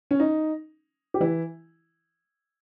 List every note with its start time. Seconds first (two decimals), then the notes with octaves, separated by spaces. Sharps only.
0.11 C#4
0.20 D#4
1.14 G4
1.20 E3 E4